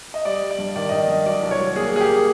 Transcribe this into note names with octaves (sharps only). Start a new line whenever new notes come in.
D#5
G3 D5
G3
D5
G2
D#3 D5
D#3 D#5
D5
G2
F#3 D5
C2
C#5
F#3
A#3 G#4
A#3 G#4
G4
A#3